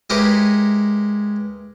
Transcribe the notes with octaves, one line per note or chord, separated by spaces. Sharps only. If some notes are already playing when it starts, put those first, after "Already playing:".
G#3 E4 G4 A#4 B4 C#5